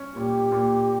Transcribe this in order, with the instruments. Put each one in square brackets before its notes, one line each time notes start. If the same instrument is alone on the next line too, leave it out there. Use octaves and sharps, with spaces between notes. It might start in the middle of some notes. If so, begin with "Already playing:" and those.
Already playing: [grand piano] C#4
[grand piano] A#2 [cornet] G4
[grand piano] A#2